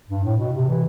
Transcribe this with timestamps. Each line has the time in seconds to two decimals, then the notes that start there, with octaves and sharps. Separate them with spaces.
0.09 G2
0.24 A2
0.38 B2
0.53 C3
0.68 E3